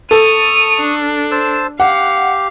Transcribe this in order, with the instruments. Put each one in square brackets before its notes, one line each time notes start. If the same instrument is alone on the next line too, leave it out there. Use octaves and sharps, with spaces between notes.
[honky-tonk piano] A4 [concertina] C#6 D#6 [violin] D#7 F7
[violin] D4
[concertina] C5 A5 E6
[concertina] G4 [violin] F5 [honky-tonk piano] F#5